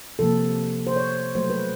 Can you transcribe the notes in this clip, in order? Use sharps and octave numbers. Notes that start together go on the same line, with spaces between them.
C3 F3 A#3 A4
C5
C#5
B2 F#3 A3 C5
B4